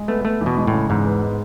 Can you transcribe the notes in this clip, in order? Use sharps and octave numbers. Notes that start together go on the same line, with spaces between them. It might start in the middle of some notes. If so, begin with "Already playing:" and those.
Already playing: G#3
A3 B3
A3 B3
E2
B2
G#3
A2
C#3
E2 G#2
B3
G#3